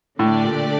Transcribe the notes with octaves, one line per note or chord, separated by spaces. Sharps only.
A2 D3 A3 D4 G4 D5
A#2